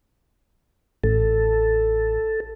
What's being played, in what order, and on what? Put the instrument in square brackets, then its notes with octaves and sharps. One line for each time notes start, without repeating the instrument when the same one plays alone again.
[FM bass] A1 [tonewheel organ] A4